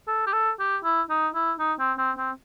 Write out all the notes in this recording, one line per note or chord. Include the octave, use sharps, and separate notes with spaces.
A4
G4
A4
G4
E4
D#4
E4
D#4
C4
C4
C4